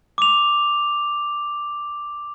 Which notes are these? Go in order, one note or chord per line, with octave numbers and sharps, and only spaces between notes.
D6 F7